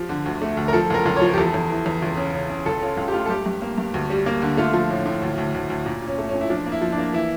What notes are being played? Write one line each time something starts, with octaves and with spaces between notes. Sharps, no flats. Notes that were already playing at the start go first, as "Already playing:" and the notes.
Already playing: F3 G4
D3
D2
A3
D2
A#4
F3 A4
C#2 A#4
C#2
C#5
F3
G4
E2 A4
E2
E3
E2
C#2
C#3
C#3
C#3
C#2 A4
C#3 F4
C#2
G4
A3 F4
A4
G2 G4
G2
A#3
G2
D2
G3
A#3
D3
A3 F4
F3
A2
A2
D2
D2
D2
D2
A#2
A#2
C#4
A3
A#2 C#4
E4
F3 D4
A#3
E4
F3
D4
A#3
E3 E4